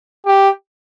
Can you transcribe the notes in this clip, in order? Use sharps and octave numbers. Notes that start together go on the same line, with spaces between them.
G4